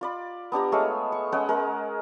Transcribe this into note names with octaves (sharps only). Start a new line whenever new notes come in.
F4 D5 B5
B3 D4 G4 A#5
G#3 A3 C#5 F5
C#6
G#3 C#4 F#5 G5
G#3 A#4